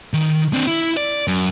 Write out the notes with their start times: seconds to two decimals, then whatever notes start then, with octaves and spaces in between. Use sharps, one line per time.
0.13 D#3
0.54 C4 D4
0.67 E4
0.97 D5
1.28 F#2